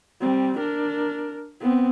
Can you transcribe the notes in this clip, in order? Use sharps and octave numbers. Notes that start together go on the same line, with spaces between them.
G3 C4
D4 A#4
B3 C4